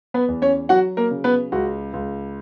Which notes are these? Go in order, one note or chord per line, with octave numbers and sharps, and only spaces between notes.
B3 B4
E2
C#4 C#5
F#3 F#4 F#5
A#3 A#4
C#3
B3 B4
C#2 F#4
C#2